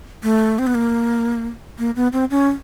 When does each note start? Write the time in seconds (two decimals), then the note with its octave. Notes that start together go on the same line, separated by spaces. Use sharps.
0.23 A3
0.59 C4
0.67 B3
0.75 A#3
1.79 A#3
1.96 B3
2.13 C4
2.31 C#4